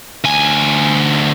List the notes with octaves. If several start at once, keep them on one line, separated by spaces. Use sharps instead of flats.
D2 G#5